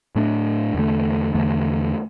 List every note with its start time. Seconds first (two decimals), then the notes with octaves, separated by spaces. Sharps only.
0.16 A2 A3 D4
0.74 E2 D3 A3
1.34 E2 D3 A3